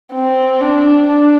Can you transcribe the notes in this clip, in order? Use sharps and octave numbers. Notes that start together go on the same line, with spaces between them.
C4
D4
D4